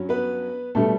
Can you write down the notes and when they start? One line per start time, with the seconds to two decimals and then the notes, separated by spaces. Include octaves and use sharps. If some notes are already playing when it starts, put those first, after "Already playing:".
Already playing: G2 F#3 C#4
0.09 B3 B4
0.75 B2 G3 A3 D4 A4